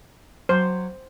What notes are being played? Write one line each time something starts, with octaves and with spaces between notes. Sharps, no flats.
F#3 C5